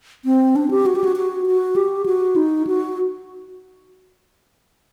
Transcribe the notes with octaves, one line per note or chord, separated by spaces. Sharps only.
C4
D4
G4
F#4
G4
F#4
F#4
F#4
G4
F#4
D#4
F#4